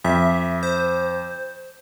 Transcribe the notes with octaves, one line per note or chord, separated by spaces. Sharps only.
F2 E5
C5